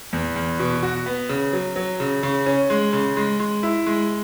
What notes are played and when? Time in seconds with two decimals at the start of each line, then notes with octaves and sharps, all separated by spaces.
0.13 E2
0.36 E2
0.59 B2
0.83 F#4
1.06 B3
1.29 C#3
1.53 F#3
1.76 F#3
2.00 C#3
2.23 C#3
2.46 C#4
2.70 G#3
2.93 C#3
3.17 G#3
3.40 G#3
3.63 E4
3.86 G#3